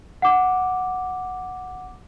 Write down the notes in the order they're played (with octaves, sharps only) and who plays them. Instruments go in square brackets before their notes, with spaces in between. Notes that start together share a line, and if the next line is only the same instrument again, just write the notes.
[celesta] F#5 D6